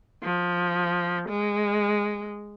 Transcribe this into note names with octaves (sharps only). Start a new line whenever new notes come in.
F3
G#3